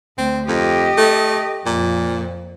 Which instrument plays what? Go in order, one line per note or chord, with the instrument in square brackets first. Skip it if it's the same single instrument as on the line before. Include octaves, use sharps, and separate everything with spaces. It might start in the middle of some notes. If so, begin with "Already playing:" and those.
[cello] D2 [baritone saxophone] C4
[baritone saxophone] F2 [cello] G4 D#5
[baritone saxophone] A3
[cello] F2 [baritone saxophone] A#2